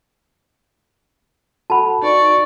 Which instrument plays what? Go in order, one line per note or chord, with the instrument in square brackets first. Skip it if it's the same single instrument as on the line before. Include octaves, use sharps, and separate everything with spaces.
[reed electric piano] F#4 A4 F#5 [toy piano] A5 B5
[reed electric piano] D#4 F#4 B4 [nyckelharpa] D5 C#6